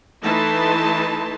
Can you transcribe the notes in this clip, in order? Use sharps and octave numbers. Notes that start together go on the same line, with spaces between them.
E3 A3 D#4 B4 A5 C6